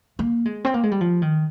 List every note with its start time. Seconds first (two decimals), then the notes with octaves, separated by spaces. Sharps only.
0.19 A#3
0.46 G#3
0.65 C4
0.74 A#3
0.83 G#3
0.92 G3
1.01 F3
1.22 D#3